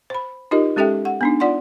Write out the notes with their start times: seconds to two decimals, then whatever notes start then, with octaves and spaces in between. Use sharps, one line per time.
0.10 C5 B5
0.51 D#4 F4 G4 A#4 D#5
0.76 G#3 C#4 G4 A4 E5 G5
1.05 F#5
1.21 B3 D4 D#4
1.40 F4 D5 F#5 C6